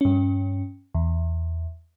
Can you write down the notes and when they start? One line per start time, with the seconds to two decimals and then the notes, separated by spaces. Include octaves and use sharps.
0.01 G2 C#4
0.94 E2